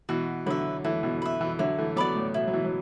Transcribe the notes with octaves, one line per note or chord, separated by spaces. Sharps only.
B2 E3 F#4
D3 F#3 B4 E5
E3 A3 E4
B2 E3
B4 E5
B2 E3
D3 F#3 E4
E3 A3
F#3 B3 D5 B5 D6
A2
B2 E4
F#3
B2 E3
F#3